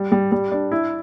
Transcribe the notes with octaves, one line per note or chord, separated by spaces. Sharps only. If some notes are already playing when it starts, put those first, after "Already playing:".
Already playing: G3
G3
G3
D4
E4